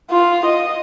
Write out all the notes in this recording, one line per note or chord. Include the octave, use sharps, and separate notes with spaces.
F4
D#5